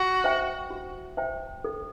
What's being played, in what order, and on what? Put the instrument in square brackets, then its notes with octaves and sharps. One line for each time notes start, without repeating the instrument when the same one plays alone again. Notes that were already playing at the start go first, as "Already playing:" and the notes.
Already playing: [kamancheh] F#4
[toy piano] C5 E5 G5
F#4
C5 E5 G5
A4